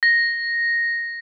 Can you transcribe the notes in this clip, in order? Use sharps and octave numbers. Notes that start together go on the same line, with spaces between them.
A#6